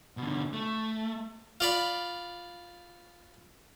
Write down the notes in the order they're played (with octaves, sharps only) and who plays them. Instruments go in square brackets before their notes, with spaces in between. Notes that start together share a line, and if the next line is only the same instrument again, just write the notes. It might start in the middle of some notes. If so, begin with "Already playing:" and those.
[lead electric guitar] B2 D3
A3
[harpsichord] F4 D5 B5